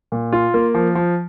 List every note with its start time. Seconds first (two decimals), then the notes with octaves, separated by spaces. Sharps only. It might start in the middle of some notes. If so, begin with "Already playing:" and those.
0.12 A#2
0.33 F4
0.54 A#3
0.74 F3
0.95 F3